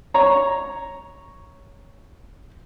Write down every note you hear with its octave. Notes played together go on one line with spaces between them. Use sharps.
C#5 A#5